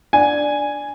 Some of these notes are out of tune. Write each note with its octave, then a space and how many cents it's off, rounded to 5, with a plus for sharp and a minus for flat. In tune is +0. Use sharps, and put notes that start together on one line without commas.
D4 +0 G#5 +0